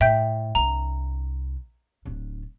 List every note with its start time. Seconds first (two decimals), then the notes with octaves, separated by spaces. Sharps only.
0.01 A2 E5 G5 G6
0.55 C2 D4 A#5
2.05 D1 D4